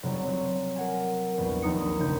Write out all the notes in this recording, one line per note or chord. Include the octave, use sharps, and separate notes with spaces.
F1 F#3 G3 D7
F#3 C4
A#4 F#5 G#5
A#1 E2 G3
A#1 D#2 D#4 D#6 C#7
F#1 D#4 G6